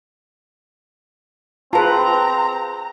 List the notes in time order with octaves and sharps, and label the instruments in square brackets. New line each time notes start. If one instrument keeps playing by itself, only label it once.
[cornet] C4 [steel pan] F4 B4 [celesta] G#4 A5 [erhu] A#5